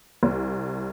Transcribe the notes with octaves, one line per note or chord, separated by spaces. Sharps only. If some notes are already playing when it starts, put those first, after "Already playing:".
C2